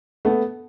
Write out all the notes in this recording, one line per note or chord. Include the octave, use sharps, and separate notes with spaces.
A3 B3